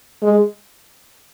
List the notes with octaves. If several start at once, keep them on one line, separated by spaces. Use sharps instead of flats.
G#3